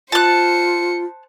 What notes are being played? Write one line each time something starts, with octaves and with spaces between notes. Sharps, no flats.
F4 C5 A5 F#6 C#7